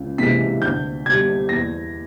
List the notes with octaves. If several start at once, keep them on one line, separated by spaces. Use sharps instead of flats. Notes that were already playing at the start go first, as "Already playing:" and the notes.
Already playing: C#2
C3 E3 G#3 B6
D2 G6
D3 G3 G#6
E2 A#6